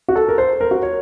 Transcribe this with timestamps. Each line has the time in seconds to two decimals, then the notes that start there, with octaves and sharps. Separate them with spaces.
0.08 F#4
0.16 A4
0.29 A#4
0.38 C5
0.61 A#4
0.71 F#4
0.83 C#5